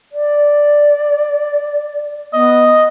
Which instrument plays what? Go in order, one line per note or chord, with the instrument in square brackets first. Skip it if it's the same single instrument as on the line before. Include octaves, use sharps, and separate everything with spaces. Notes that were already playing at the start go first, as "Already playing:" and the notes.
[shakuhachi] D5
[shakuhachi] B3 [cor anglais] D#5